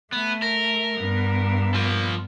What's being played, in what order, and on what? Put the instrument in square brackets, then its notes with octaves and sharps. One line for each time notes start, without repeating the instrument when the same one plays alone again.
[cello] A3 [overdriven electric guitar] B3
[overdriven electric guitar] A#4
[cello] G2 B3
[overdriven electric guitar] F3 A#3